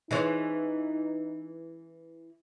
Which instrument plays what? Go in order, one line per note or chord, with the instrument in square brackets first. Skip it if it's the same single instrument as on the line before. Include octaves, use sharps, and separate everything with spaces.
[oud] E3 G#3 C#4 [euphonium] D#4